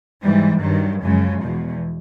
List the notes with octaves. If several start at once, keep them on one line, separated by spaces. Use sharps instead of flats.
G#2 E3 G3
G2 D#3 F#3
F#2 C#3 F3 G#3
E2 B2 G#3